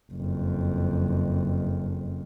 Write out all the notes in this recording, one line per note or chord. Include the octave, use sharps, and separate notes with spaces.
F#1 F2